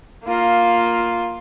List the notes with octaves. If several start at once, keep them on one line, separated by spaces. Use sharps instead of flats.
A#3 F4